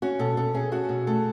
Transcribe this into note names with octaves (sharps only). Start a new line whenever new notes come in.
C#4 F#4
B2 A4
B2 A4
C#4 G#4
C#4 F#4
B2
A3 A4